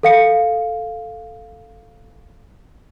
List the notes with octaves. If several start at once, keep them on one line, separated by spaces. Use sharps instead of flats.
A4 F5 C#7